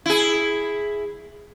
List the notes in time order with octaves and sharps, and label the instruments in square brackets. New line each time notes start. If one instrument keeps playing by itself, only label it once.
[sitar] E4 G#4